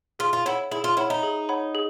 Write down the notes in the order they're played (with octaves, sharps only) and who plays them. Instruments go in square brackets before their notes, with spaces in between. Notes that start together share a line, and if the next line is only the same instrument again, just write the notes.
[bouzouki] F4 [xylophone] G#4
[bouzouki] F4
[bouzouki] E4 [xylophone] C#5 F#5 B5
[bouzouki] E4 [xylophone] G#4
[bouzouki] F4
[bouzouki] E4 [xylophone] C#5 F#5 B5
[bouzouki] D#4
[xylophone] G#4
C#5 F#5 B5
G#4